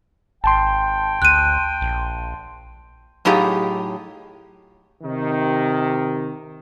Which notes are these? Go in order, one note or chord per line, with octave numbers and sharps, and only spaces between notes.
G#1 G5 A5 C6
D2 F#6 D#7
A#1
A2 F#3 D#4 F4 G4 G#4
C3 D#3